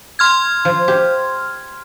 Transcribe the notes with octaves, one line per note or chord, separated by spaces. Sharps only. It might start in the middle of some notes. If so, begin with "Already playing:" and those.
C6 F6 G#6
F3
G4